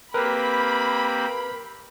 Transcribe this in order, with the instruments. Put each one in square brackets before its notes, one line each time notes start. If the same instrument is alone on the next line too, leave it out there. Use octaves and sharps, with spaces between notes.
[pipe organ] A#3 C4 G4 [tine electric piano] A#4 B4 [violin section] B5